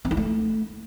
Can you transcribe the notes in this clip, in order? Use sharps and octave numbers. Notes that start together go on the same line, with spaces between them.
C4
E4
A3